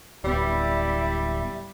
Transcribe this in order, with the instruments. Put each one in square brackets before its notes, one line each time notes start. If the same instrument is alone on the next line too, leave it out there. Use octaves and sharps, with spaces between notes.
[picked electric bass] D1 B3 [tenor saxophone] G3 [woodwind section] E4 D5 E5